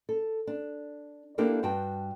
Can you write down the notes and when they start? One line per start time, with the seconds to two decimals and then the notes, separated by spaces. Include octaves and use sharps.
0.09 A4
0.47 D4
1.38 A#3 D4 E4 G4 A4 A#4
1.63 G2 F#4 G5 A5